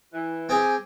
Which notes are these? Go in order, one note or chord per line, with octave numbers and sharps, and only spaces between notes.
E3
C4 G4 G#4 G#5